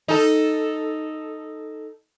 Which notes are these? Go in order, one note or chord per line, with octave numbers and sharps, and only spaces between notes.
D#4 A4